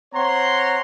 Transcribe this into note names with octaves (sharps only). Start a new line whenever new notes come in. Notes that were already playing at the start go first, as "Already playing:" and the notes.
C4 C#5 F#5 A#5 C6